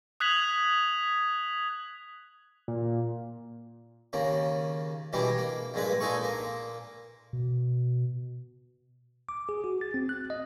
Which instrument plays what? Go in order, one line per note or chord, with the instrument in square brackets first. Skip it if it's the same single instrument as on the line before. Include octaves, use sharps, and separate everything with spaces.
[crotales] D#6 F#6 G#6 B6 F7 F#7
[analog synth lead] A#2
[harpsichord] D#2 C#3 A#3
B2 E3 G3 G#3 D4
A#3
A#1 G2 G#3 A#3 B4
A#2 G#3 D#4 G#4 A4 C#6
A#2 A#3
[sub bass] B2
[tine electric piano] D6
G#4
F#4
A6
C4
F#6
D#5